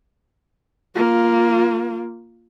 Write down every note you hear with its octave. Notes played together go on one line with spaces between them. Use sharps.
A#3 F4